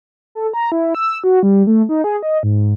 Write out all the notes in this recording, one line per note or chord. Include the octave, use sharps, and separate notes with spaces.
A4
A#5
E4
E6
F#4
G3
A3
D#4
G#4
D#5
G#2